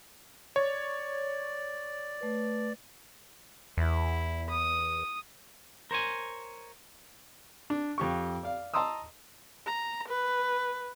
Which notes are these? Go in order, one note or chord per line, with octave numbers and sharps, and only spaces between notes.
C#5 D5
A3 B4
E2 E4
D#6
A#4 C5 C#5 G#5
D4
F2 G4 C#6
D5 F5
D#5 A5 A#5 C6 D#6 E6
A#5
B4